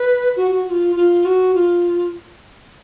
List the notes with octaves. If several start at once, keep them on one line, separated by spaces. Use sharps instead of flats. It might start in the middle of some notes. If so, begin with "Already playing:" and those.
Already playing: B4
F#4
F#4
F#4
F4
F4
F#4
F4